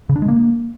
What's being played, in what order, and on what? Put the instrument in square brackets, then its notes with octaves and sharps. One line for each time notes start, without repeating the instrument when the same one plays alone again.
[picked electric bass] C#3
D4
G#3
A#3